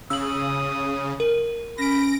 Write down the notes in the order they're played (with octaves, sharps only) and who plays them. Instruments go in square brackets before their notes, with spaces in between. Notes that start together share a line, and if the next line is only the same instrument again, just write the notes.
[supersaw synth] C#3 [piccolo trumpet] D#6 [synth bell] E6 F#7
[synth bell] A#4
[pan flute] C#4 [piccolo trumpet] B5 [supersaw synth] A#6 D7